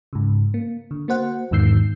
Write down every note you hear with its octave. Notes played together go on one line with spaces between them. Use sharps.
G#2 C#3
A#3
D3
A#3 F#4 C5 F#5
E2 G#2 D#3 E6 G6 C7